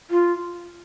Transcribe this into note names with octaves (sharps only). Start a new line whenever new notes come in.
F4